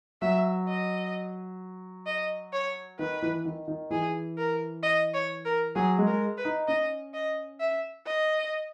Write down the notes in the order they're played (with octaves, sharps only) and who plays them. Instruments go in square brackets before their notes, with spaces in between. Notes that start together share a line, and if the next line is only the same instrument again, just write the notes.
[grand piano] F#3 [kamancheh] E5
[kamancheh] D#5
D#5
C#5
[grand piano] D#3 [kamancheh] B4
[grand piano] E3
D#3
D#3
[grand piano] E3 [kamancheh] G#4
[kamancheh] A#4
D#5
C#5
A#4
[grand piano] F#3 [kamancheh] G#4
[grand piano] G#3
[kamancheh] A#4
B4
[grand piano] D#4
[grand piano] C#4 [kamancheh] D#5
[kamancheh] D#5
E5
D#5